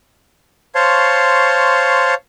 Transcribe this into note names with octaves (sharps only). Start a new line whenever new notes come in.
C5 C#5 F5 A5 C6 C#6